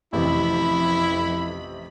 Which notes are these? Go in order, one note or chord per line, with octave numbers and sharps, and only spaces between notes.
A1 F2 C3 E3 E4 B5